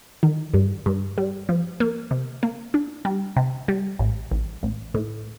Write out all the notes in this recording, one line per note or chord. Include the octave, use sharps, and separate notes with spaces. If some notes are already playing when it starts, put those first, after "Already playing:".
D#3
G2
G2
G3
F3
A#3
C3
A#3
D4
G3
C3
G3
A1
A1
A1
A2